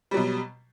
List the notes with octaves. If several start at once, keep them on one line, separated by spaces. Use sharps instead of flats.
B2 F#3 G3